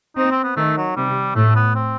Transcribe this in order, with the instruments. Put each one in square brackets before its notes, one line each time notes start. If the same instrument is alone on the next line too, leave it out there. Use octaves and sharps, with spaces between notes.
[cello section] C4 [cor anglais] D#4
[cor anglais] C4
B3
[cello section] D#3 [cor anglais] A3
[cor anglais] F#3
[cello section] C3 [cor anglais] G3
[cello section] A2 [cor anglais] A3
[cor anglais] B3
C4